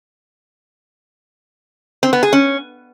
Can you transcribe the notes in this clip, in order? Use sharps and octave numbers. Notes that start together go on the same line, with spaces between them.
C4
B3
G#4
C#4